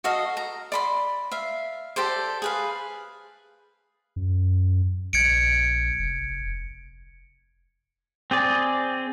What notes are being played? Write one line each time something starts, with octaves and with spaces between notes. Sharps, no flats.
F#4 A4 D#5 F5
A#5
D5 B5 C6
E5 F5
G4 A4 C5 D5
G#4 B4 F5
F#2
A#1 G#6 C#7 D7
F1
C4 G#4 D5